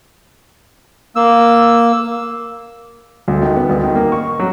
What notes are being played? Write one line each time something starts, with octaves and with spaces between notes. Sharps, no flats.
A#3 E6
D2
D#3
B3
D2
D#3
A#3
C#6
F#3